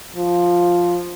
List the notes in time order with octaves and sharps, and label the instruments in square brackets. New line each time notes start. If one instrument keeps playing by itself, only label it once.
[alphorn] F3